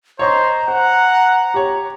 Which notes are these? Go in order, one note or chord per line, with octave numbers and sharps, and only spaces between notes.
C5 C#5 D#5 A#5 C#6
C5 F#5
G4 C#5